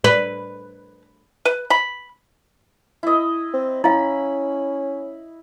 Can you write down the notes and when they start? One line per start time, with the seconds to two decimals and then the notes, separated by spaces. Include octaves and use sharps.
0.04 B4
1.45 B4
1.70 B5
3.03 E4 D#5
3.54 C4
3.84 C#4 E4 F5 B5